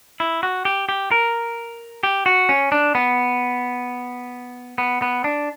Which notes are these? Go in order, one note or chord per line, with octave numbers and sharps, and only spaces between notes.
E4
F#4
G4
G4
A#4
G4
F#4
C#4
D4
B3
B3
B3
D4